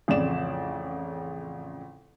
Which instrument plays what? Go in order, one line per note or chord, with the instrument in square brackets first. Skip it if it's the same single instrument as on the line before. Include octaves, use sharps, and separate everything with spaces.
[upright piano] A1 F2 C#3 D5 E7